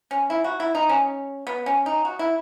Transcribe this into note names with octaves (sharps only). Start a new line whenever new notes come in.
C#4
E4
F#4
E4
D#4
C#4
B3
C#4
D#4
F#4
E4